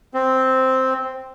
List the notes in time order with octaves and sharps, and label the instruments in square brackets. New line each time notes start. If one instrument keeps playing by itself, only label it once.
[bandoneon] C4